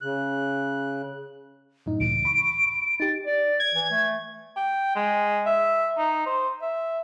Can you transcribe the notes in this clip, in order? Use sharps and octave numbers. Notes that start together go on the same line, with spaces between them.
C#3 F#6
F#2 A2 D#4
C#2 A2 E3 D7
B5 C#6
D#4 G4 A6
D5
G#6
E3
A3
G5
G#3
E5
D#4
C5
E5